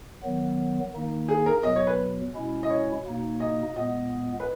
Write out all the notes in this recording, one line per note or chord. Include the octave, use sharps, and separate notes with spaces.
D#3 F#3 B3
D#3 A#3 D#4
G#4
A#4
E2 B2 F#3 D#5
C#5
B4
B2 G#3 C#4 E4
D#5
C#5
B2 A#3 D#4
D#5
A#2 G#3 B3 D#5
B4